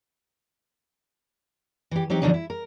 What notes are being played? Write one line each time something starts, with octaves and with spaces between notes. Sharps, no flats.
E3 G4
F#3 C4 D#4 G4
A#2 D3 F3 F#3 D4 D#4
E4
A#4